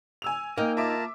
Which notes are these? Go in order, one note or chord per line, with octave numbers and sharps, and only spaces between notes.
G#5 E6 F7
A#3 D#4 D#5 G5 F6
F4 E5 A5 A#5 D6